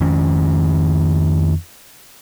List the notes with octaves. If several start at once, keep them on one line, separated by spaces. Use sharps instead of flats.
F2 D#3 C#4